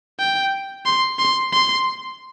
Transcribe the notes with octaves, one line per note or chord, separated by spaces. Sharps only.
G5
C6
C6
C6